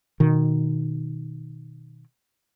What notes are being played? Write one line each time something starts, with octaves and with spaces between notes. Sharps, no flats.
B2 D#3